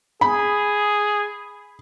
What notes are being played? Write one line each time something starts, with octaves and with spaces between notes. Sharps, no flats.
G#4 B5